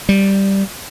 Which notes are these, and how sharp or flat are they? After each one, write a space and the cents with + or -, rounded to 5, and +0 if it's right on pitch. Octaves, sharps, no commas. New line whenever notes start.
G3 +0